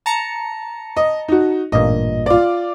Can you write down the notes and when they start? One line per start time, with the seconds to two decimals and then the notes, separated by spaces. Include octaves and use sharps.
0.06 A5 A#5 C#7
0.97 D#5
1.28 D#4 F#4
1.72 A1 G2 A#2 D#5
2.26 F4 D5